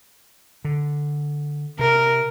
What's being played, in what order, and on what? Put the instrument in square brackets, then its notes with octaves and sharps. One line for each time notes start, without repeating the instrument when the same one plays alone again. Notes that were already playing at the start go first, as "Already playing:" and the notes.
[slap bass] D3
[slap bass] C3 [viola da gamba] A#4